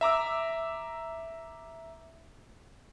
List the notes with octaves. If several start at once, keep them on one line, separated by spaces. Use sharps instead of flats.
E5 A#5 D6 E6